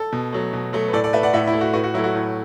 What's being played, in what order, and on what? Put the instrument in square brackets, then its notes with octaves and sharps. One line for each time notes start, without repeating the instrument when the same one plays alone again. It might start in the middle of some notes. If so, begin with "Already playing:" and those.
Already playing: [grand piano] A4
B2
F#3 A3
B2
F#3 A3
B4
A2 A4 D5
A4 D5
A3 B4 E5
D5 F#5
A2 B4 E5
E4
A3
F#4
A2 F#4 B4
F#4
F#3 E4
A3
F#4
A2